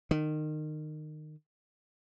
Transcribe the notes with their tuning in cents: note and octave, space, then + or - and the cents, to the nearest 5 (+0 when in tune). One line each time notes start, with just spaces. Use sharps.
D#3 -25